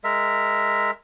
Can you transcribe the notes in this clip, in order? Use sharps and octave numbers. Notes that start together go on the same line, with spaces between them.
G#3 A#4 E5